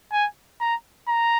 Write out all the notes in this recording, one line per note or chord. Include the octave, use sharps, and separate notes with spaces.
G#5
A#5
A#5